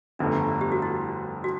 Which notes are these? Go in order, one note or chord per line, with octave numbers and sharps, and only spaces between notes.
G1 F2 D3 F3 A3 D4
G4
F#4
E4
F#4